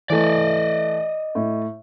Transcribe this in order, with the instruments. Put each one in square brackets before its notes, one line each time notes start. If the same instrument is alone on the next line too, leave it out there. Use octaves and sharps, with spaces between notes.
[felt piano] E3 A3 [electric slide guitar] D5 D#5
[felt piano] A2